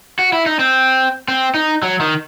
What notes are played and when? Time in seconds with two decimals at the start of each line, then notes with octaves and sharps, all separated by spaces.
0.19 F#4
0.33 E4
0.46 D#4
0.59 C4
1.28 C4
1.54 D#4
1.82 F#3
2.00 D#3